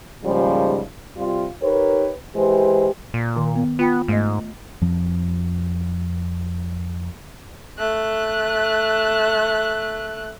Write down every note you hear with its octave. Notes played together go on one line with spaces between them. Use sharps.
D#2 G#2 C#3 F3 G3
C3 G3 F4
D#4 G4 A#4 B4 C#5
E3 G#3 G4 C5
A#2
D#3
B3
B3 F4 G5 B5
G#2 A3 D#5
F2 F3
A3 F#6